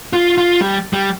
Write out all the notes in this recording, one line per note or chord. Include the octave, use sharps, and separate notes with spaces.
F4
F4
G3
G3